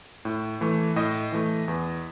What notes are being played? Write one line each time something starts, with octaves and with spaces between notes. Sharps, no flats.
A2
E3 A3
A2 D#5
E3 A3
E2